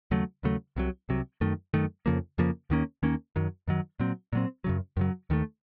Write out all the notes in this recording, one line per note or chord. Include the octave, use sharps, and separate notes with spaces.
D#2 C#3 F#3 A3
D#2 C#3 F#3 A3
C2 C3 F#3
C2 C3 F#3
F#2 D#3 A3
F#2 D#3 A3
F2 C#3 F3 A#3
F2 C#3 F3 A#3
D#2 D#3 A#3 C#4
D#2 D#3 A#3 C#4
F#2 D#3 F#3
F#2 D#3 F#3
A#2 F#3 C4
A#2 F#3 C4
F#2 C#3 F#3
F#2 C#3 F#3
D#2 D#3 A3